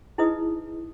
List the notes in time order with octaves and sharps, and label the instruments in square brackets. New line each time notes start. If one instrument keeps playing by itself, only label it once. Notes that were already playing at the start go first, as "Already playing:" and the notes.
[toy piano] D#4 E4 G#4 B4 D#5 D#6